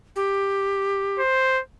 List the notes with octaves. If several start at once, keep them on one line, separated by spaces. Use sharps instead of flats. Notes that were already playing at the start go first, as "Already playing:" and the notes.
G4
C5